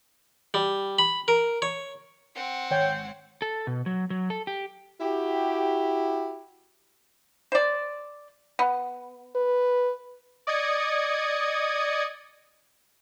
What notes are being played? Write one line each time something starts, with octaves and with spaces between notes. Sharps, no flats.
G3
B5
A#4
C#5
C4 F#5
G#1 C#5 G5
A4
B2
F#3
F#3
A4
G4
E4 F#4 G4
C5 D5
B3
B4
D5 D#5 D#6 G#6 C#7